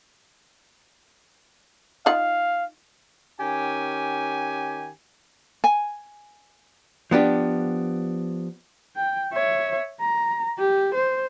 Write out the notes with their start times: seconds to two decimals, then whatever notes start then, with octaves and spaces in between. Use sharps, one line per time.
2.06 D#4 F4 F5 F#5
3.40 D#3 C#4 G4 G#5
5.64 G#5
7.11 F3 B3 D4 G4
8.97 G5
9.33 C#5 E5
10.00 A#5
10.58 G4
10.94 C5